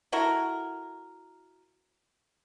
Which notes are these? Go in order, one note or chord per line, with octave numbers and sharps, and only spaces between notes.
E4 F#4 A4 A#4